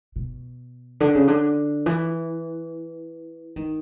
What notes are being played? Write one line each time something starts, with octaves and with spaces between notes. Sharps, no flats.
B2
D3
C#3
D3
E3
D#3